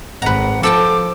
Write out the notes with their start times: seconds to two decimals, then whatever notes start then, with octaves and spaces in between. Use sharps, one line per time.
0.22 G#1 B4 F#5 A#5
0.63 F3 A4 G5 A5 D6